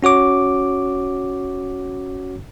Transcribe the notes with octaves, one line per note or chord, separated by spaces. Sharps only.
C#4 F#4 C#5 D6